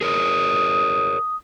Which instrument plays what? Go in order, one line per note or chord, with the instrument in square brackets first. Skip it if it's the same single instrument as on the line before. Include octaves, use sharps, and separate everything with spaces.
[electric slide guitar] G#4 A#4 C#5 [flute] D#6